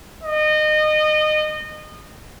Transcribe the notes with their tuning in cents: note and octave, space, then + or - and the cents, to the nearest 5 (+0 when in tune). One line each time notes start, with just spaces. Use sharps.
D#5 -25